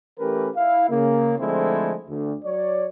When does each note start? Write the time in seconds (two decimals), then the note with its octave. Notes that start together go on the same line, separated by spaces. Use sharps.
0.19 E3 A3 C#4 G4 A#4 B4
0.56 E4 F5
0.89 C#3 A#3
1.39 D3 F3 G#3 A3 C4 E4
2.08 D2
2.44 F#3 C#5 D5